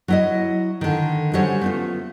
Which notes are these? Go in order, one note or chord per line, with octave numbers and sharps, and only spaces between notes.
F#3 E4 D#5
D3 D#3
D3 F#3 G3 C#4 C5 C#5
A3 B3 F4